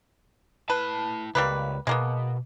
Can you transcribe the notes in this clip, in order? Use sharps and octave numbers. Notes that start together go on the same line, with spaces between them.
E4 B4 A5
C#2 G3 A#3 B4
B2 G#3 A#3 B3